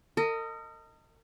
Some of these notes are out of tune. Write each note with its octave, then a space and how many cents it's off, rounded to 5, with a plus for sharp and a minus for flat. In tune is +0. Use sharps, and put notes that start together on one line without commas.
A#4 -45 D#5 +0